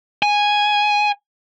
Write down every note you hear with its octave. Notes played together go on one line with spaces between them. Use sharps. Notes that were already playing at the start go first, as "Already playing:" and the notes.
G#5